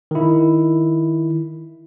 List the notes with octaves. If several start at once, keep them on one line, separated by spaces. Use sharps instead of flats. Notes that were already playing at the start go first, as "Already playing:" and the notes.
D#3 E4